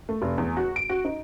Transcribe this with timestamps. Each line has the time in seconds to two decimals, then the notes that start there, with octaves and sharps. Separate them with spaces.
0.09 A3
0.22 F1
0.38 E2
0.57 F#4
0.76 D7
0.90 F#4
1.05 D#4